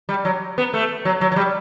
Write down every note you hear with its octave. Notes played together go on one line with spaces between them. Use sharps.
G3
F#3
B3
A3
F#3
F#3
F#3
G3